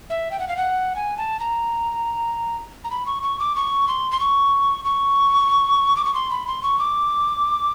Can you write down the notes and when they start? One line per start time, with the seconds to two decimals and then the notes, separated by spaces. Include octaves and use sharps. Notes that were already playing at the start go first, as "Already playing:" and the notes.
0.10 E5
0.31 G5
0.39 F#5
0.48 F5
0.57 F#5
0.96 G#5
1.17 A5
1.40 A#5
2.84 A#5
2.91 B5
3.06 C#6
3.23 C#6
3.39 D6
3.56 C#6
3.88 C6
4.11 C6
4.20 C#6
4.85 C#6
5.97 D6
6.05 C#6
6.14 C6
6.31 B5
6.47 C6
6.63 C#6
6.79 D6